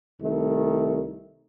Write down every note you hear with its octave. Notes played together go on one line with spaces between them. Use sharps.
C2 D#3 A3